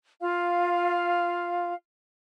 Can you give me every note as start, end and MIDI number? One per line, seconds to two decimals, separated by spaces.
0.21 1.74 65
0.21 1.74 77